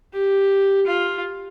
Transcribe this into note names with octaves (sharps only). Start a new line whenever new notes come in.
G4
F4